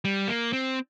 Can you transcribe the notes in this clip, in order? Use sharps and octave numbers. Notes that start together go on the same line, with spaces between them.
G3
A#3
C4